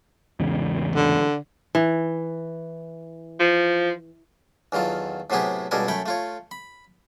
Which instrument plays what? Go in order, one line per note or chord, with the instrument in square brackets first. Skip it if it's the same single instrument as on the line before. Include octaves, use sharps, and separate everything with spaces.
[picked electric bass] E2 G#2 C#3
[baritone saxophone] D3
[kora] E3
[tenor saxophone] F3
[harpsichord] E2 D#3 F#3 F4 A4
A2 C3 F#3 B3 G4 G#4
C#2 B2 G3 A4 A#4 G#5
F#2 A3 C#5 G5 B5
A3 F4 C#5
B5